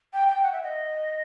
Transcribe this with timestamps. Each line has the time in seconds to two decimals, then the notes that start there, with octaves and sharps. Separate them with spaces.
0.13 G5
0.28 G5
0.43 F#5
0.52 E5
0.63 D#5